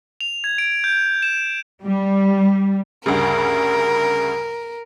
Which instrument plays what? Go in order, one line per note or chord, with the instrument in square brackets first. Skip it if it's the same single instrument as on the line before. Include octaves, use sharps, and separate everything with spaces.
[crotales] F7
G#6
D7
G6
E7
[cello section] G3
[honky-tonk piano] D2 G2 C#3 [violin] A#4